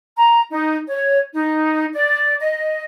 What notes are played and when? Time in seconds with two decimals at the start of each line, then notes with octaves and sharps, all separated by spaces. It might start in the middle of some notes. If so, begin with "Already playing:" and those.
0.16 A#5
0.49 D#4
0.88 C#5
1.33 D#4
1.94 D5
2.39 D#5